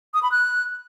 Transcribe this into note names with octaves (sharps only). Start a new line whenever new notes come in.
D#6
B5
F#6